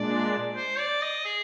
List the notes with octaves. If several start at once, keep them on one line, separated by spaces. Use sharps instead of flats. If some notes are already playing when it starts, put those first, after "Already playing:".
Already playing: A#2 G#3 D4 D5
C5
D5
D#5
G#4